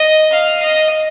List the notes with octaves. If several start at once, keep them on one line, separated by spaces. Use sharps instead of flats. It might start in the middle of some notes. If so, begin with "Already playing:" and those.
Already playing: D#5
F5
D#5